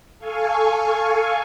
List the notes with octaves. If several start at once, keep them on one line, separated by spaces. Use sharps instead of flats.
A4 F5 G#5 C#6